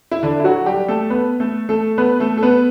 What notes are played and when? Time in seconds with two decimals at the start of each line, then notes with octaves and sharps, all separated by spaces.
0.11 E4
0.23 D3 D4
0.40 E4
0.44 F#3 F#4
0.66 G3 G4
0.88 A3 A4
1.10 B3 B4
1.40 A3 A4
1.69 A3 A4
1.98 B3 B4
2.20 A3 A4
2.37 A4
2.43 B3 B4